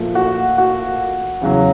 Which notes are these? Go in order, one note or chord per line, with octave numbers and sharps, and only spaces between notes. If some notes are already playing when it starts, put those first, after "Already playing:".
Already playing: A#2 F3 A3
F#4
F#4
E2 C#3 F#3